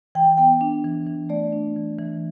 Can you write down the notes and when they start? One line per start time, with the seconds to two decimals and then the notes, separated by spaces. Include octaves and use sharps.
0.15 E3 G5
0.37 B3 G5
0.61 D4
0.84 E3
1.07 E3
1.29 A3 D5
1.52 D4
1.76 E3
1.98 E3